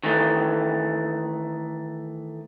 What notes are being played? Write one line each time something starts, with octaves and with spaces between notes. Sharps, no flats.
D#3 E3 A3